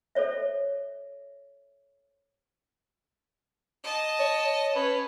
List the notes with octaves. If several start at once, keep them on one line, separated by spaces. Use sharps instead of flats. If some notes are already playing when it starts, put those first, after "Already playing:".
A4 C5 C#5 E5
D#5 A5
C#5
C#4 B4